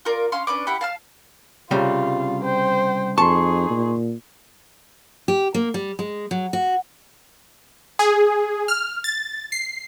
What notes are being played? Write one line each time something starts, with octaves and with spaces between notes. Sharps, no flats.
F4 A#4 D5
C#4 F5 C6
C#4 D4 B4 D6
E4 G4 F#5 B5
F5 A5 F6
C2 C#3 G3 F4
C5 G5
F2 D#4 G#4 A5 C6 C#6
A#2
G4
A#3
G3
G#3
F#3
F#4
G#4
F6
A6
C7